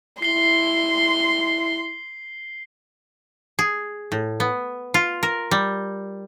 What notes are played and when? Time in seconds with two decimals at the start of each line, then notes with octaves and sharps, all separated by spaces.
0.22 E4 C6 C7 G7
3.59 G#4
4.12 A2
4.40 B3
4.94 F4
5.23 A#4
5.51 G3